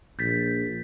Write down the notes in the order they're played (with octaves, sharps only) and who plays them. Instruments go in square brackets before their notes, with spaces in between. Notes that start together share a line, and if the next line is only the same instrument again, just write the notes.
[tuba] A#1 [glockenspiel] G6 A6 B6